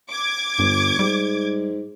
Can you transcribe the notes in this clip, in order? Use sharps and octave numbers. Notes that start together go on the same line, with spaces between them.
D6 G#6
G1 G2
G#2 G3